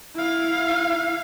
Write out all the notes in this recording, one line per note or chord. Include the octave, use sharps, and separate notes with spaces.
E4 F5